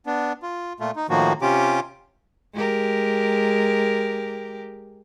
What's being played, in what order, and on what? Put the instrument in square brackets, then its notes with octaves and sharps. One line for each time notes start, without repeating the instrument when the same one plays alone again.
[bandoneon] B3 D4
F4
A#2 A3 F4
D#4
A2 D#3 F3 A#3 F#4
C3 C#4 F4 G4 D6
[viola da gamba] G#3 G4 A#4